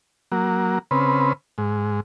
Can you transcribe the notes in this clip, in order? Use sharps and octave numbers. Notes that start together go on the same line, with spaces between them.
F#3 A#3
C#3 C4 B4
G#2